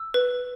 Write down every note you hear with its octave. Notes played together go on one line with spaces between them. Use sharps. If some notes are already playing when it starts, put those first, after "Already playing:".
Already playing: E6
B4